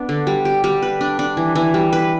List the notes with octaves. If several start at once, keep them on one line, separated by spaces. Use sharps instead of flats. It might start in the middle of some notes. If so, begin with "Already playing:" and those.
Already playing: B3 D4
D3
G3
G4
G3
B4
D4
D4
E3
E3
G3
B4